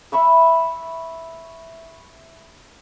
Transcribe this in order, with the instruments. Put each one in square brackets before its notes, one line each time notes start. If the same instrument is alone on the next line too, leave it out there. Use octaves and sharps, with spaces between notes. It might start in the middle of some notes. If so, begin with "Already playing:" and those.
[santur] E5 B5 C#6 E6